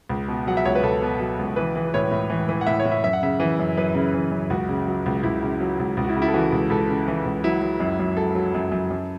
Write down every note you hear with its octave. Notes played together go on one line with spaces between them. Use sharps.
C#2
B2
F#3 F#5
E5
C#2 C#5
B4
C#2 A4
B2
F#3
C#2
E3 B4
E3
A2 C#5
A2
E3
E3
F#5
A2 E5
C#5
A2
E5
F#2 E5
F#5
C#3 E5
E3
F#2
F#2 B4
C#3
E3
F#2
C#2 F#4
C#3
F#3
C#2
C#2 E4
C#3
F#3
C#2
C#2
F#4
E4
C#3
E4
A4
E3 F#4
C#2
C#2 A4
C#3
E3
C#2
F#3 E4
F#3
F#2
F#2
F#3 A4
F#3
F#2
F#2
F#2